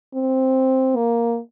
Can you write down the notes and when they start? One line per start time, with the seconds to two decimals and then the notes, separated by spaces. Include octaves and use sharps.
0.14 C4
0.96 A#3